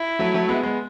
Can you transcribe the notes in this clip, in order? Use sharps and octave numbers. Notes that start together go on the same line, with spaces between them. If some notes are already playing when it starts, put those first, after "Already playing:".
Already playing: E4
F#3 A3
F#3 A3
G#3 B3
G#3 B3